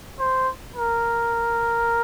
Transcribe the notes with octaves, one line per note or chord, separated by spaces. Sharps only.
C5
A#4